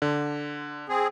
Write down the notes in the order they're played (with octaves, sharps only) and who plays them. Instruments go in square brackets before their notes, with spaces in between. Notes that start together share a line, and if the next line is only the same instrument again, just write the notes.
[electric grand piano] D3
[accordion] C4 G#4